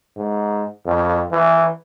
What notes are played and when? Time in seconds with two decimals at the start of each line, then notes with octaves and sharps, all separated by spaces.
0.17 G#2
0.85 F2
1.31 E3